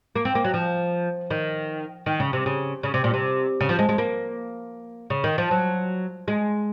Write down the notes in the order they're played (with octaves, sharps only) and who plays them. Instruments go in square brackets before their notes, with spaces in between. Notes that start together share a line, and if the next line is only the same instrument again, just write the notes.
[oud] A#3
C4
A#3
F#3
F3
D#3
D#3
C#3
C3
C#3
C#3
C3
A#2
C3
C#3
F3
G#3
G#3
A#3
C#3
D#3
F3
F#3
G#3